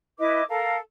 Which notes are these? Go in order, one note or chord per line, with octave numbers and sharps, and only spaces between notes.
E4 B4 D#5 D6
A4 A#4 F5